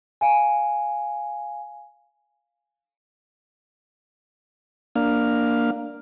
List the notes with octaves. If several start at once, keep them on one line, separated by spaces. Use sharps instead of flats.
F5 G#5
A#3 D4 F5